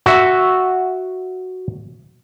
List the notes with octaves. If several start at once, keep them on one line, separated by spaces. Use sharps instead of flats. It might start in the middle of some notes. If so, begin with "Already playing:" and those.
F#4 E5